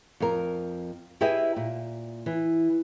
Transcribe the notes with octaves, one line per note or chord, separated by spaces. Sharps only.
F2 A#4
E4 G4 G#4 B4 D#5 E5
A#2
E3